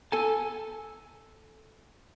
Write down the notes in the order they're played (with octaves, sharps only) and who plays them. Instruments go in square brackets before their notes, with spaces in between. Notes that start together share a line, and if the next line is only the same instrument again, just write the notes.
[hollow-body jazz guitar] A4 G#5 A5